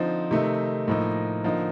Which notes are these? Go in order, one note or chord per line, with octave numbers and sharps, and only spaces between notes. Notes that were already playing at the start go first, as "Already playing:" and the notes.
Already playing: D3 F3 C4 D#4
C3 D#3 A3 D#4
A2 F3 A#3 D#4
D3 F3 A#3 D#4